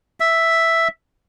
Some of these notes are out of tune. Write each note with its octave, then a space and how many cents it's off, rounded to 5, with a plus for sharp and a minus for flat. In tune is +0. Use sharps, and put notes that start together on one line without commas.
E5 +0